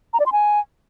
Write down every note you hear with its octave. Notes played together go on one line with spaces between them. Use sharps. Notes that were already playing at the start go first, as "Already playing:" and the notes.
A#5
D5
C6
G#5